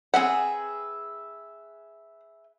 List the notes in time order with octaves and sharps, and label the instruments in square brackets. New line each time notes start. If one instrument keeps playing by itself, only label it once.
[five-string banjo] C4 F#5 [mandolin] G#4 B4 E5